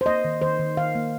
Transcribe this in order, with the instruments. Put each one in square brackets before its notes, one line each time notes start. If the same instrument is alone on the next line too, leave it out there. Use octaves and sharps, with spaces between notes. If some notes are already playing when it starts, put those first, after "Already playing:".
[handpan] C5
A#3 D#5
D#3
D#3 C5
D#3
D#3 F5
A#3